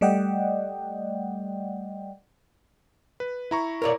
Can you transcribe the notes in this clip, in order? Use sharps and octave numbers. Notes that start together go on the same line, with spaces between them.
G3 A3 D5 D#5 F#5 G5
B4
E4 A#5 C#6
A#4 C#5 D5